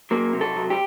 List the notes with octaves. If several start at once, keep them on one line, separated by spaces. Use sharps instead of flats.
F#3 A#3
C3
A4
F#3
G4